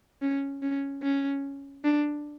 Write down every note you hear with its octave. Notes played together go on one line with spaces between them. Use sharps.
C#4
C#4
C#4
D4